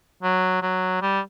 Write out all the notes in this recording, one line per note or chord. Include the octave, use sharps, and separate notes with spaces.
F#3
F#3
G3